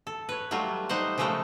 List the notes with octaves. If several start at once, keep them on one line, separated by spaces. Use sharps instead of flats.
A4
B4 C#5
F#3 G3 A3 F4 F#4
G3 D#4 C5 F#5
C#3 F3 G#3 A3 A4 A#4